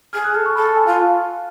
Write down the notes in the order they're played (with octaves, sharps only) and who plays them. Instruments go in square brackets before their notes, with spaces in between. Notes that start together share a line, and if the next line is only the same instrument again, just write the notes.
[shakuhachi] G#4 [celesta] F6
[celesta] F#6
[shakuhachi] A4 [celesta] F6
[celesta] C#6
[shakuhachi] A4 [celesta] B5
[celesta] A5
G#5
[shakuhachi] F4 [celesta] F5